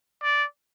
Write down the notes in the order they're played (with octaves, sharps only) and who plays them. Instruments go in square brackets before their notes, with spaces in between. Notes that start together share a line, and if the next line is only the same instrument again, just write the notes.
[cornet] D5